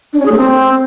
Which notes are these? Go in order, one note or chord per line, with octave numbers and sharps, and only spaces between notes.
D4
C#4
G#4
A3
C4